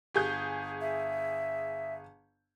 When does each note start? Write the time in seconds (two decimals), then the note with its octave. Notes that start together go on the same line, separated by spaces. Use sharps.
0.15 G1 G#4 G6
0.81 E5